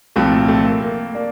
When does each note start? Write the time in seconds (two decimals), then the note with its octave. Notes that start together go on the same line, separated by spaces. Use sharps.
0.16 C2 A#2 F3 A3 C4
0.48 A3 C4
0.65 A#3
0.81 A#3
1.15 A#3 D4